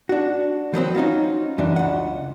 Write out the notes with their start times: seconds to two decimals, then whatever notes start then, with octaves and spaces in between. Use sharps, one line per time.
0.09 D4 F#4
0.74 F3 F#3 B3 C4
0.95 C#4 D#4 F4 F#4
1.58 F#2 E3 D4
1.76 C#2 F#5